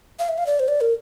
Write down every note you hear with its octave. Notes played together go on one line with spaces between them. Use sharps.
F5
E5
F5
D5
C5
D5
A#4